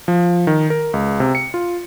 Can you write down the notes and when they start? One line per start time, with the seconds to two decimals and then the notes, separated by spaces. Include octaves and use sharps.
0.08 F3
0.47 D#3
0.70 A#4
0.94 C#2
1.20 C3
1.35 C#7
1.54 F4